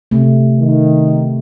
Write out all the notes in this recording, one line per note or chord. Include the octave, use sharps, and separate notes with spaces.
C3 A3
D#3